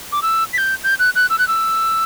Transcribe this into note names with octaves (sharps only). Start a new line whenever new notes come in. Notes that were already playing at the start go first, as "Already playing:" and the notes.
D6
E6
B6
G6
G6
F#6
F#6
E6
F#6
E6